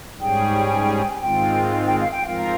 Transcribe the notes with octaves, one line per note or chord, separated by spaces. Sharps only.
G#2 G3 C#4 G#4 G5
G#2 D#3 G#3 C4 F4 G5
G5
F5
G5
G#2 F3 C4 F4 A#4 F5